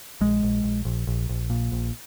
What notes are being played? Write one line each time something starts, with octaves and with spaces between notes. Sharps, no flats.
A#1 G#3
A#1
A#1
A#1
A#1
A#1
A#2
A#1